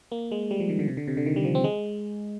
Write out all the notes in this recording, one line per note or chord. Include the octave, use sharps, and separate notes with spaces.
A#3
G#3
G3
F3
D#3
D3
C3
D3
C3
D3
D#3
G3
F3
C4
G#3